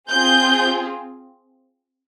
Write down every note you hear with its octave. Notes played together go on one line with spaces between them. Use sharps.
C4 F4 G#4 G6